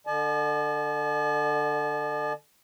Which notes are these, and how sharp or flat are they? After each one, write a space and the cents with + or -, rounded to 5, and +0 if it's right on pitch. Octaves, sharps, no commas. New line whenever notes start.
D3 +15 D5 +45 A5 -40